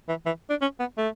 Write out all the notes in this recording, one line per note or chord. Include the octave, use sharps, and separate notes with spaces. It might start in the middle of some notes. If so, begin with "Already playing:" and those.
E3
E3
D4
C#4
B3
A3